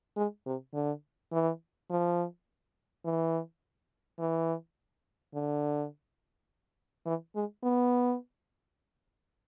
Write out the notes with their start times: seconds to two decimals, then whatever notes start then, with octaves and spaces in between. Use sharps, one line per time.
0.17 G#3
0.46 C3
0.74 D3
1.32 E3
1.90 F3
3.05 E3
4.19 E3
5.34 D3
7.06 E3
7.36 G#3
7.63 B3